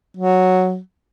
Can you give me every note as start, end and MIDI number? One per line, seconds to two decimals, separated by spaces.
0.17 0.79 54